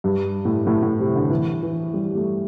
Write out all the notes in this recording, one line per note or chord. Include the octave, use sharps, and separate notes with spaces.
G2
A2
A2
A2
C3
D3
E3
E3
G3
A3